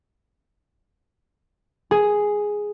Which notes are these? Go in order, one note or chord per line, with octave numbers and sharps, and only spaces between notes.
G#4